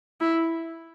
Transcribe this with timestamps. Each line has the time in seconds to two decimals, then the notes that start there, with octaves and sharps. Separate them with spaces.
0.21 E4